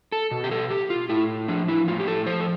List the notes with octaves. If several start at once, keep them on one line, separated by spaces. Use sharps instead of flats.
A4
B2
G4
A4
G4
F4
A2 E4
F3 D4
E4
A2 F4
G4
A4
F3 C5
A4